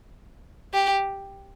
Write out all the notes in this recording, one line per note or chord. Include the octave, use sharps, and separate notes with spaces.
G4